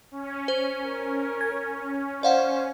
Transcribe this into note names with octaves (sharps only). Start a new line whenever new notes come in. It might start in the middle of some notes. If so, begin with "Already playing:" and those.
C#4
C5
A#4
G#6
C5 D5 F5 F#5